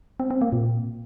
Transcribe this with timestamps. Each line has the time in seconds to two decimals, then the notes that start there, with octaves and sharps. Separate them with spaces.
0.20 C4
0.31 C4
0.42 A#3
0.52 A#2